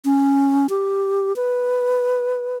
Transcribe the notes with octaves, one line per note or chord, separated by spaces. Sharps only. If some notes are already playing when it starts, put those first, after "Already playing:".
C#4
G4
B4